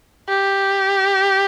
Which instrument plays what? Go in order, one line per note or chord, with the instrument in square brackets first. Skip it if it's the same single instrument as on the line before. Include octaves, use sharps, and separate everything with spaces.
[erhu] G4